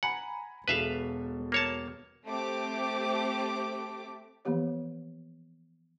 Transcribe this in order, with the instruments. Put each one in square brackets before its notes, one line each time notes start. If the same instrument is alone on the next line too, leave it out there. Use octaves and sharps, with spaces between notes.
[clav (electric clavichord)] F#5 [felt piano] G#5 A#5 B5
[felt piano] E1 B2 A4 [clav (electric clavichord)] B4 E5 F5
[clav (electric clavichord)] A#3 C#5 A5
[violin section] A3 C4 G4 D6
[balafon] E3 F3 A#3 B3 G4 C#5